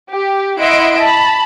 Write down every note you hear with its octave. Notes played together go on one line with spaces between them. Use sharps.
G4
E4 D#5 E5 F#5 C6 D7
A5 B5